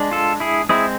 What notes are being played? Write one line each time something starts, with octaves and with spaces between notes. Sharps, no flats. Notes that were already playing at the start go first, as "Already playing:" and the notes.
Already playing: G#3 D4
F4 A4
E4 G#4
G#3 C4 E4 G#4